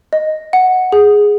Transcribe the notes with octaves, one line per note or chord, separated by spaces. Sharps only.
D#5
F#5
G#4